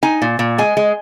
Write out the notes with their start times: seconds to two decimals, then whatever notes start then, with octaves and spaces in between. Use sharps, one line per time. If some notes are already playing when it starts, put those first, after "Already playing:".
0.03 D#4 G#5
0.22 A#2
0.39 A#2
0.58 G#3 G#5
0.77 G#3